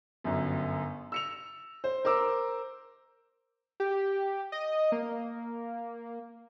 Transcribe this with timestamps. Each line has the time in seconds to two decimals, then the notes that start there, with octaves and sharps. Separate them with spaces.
0.24 G1 F#2
1.12 E6 C#7 F7
1.84 C5
2.05 A#4 C5 D6 E6
3.80 G4
4.52 D#5
4.92 A#3